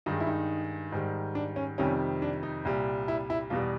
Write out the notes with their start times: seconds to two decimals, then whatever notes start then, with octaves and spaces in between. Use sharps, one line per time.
0.06 G2 D#3 G#3 D#4
0.20 E4
0.27 D#4
0.92 G#2 D#3 G3
1.35 D4
1.56 C#4
1.78 F2 C3 D#3 G3 C#4
2.22 D4
2.43 D#4
2.65 C2 A#2 G3
3.08 E4
3.30 E4
3.50 E2 B2 G3 F4